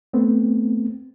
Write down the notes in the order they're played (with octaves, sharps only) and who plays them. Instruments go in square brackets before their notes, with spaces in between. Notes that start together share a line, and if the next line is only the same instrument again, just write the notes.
[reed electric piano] A3 B3 C4